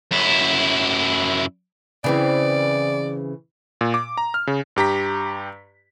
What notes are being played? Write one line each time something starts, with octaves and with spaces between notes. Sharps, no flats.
F#2 E4
C#3 E3 C4 D5
A#2
D6
A#5
F6
C#3
G2 G4 A#5 B6